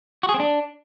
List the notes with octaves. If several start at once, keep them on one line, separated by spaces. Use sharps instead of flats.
F#4
G#4
C4
D4